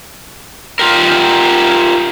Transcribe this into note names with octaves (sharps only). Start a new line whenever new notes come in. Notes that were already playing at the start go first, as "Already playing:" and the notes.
F4 G4 A#4